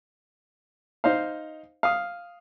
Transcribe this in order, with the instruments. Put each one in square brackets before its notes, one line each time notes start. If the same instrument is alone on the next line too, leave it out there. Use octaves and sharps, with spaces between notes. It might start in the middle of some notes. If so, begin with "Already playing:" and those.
[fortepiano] D#4 C5 F5
F5 D#6